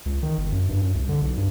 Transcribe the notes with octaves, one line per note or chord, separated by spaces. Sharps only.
C#2
D#3
G1
F#2
G2
F#2
C2
D3
B1
G2